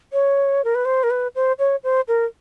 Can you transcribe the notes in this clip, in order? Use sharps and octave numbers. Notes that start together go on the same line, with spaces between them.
C#5
A#4
B4
C5
A#4
B4
C5
C#5
C5
A#4